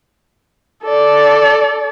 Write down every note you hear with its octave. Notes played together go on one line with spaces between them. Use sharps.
A4 D5